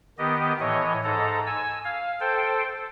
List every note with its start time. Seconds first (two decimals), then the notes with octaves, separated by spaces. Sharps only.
0.18 D#3 B3 G4 D#5
0.60 A2 E3 C#5 D#5
1.04 G#2 A4 A#5
1.47 G#5 E6
1.84 F5
2.20 A4 C5 G5